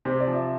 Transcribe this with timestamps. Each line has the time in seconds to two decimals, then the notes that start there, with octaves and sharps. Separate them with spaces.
0.05 C3 C5
0.20 D5
0.27 F3
0.35 E5